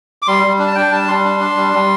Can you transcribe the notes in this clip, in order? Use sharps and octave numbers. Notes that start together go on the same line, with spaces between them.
D6
G3 C6
G3
D4
A5
D4 G5
G3 A5
G3 C6
D4
D4
G3
G3